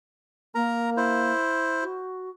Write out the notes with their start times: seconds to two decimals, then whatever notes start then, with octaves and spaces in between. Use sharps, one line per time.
0.55 A#3 A#4 A#5
0.97 E4 C5
1.82 F#4